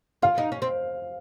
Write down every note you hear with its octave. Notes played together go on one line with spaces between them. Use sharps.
F4 F5
D#4
C#4
C4